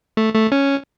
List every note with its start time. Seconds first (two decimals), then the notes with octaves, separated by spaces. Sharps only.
0.17 A3
0.35 A3
0.52 C#4